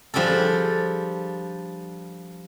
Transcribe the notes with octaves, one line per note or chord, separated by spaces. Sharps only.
F3 G3 D4 G#4 A4